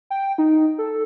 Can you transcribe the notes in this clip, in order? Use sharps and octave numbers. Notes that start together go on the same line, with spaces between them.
G5
D#4
A4